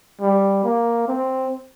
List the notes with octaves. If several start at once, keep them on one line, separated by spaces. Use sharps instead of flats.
G3
A#3
C4